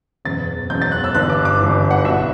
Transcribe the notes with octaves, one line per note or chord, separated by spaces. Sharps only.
F#1 E2 B2 A6
F#1 E2 B2 G6
A6
F#6
E6
G1 G2 E3 F#6
D6
D6
G1 G2 E3
F#5
B1 B2 E5